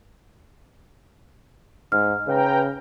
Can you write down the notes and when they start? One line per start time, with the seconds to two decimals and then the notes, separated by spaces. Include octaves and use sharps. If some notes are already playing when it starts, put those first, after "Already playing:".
1.92 G#2 F6
2.27 C#3 B4 G5 A#5